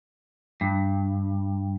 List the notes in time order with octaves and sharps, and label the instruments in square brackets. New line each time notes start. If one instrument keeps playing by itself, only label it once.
[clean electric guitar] G2